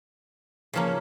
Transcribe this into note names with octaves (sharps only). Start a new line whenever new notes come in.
C#3 F3 A#3 C#4